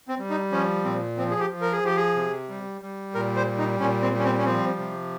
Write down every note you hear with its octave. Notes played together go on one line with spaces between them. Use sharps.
C4
G3
D#4
F3 C#4
A#2 C4
F3 C4
G#4
G4
F3
A#4
G#4
F3 G4
G#4
C3
G3
G3
A#2 A#4
C5
G3
D#4
A#2 C#4
C4
G3
C#4
C4
C#4
F3 C4
C3